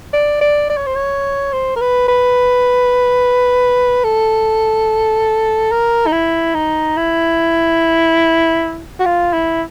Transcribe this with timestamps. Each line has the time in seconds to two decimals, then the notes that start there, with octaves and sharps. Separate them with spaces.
0.13 D5
0.41 D5
0.69 D5
0.77 C#5
0.86 C5
0.95 C#5
1.52 C5
1.76 A#4
1.81 B4
2.08 B4
4.04 A4
5.71 A#4
6.07 D#4
6.12 E4
6.55 D#4
6.97 E4
9.00 F#4
9.06 F4
9.33 E4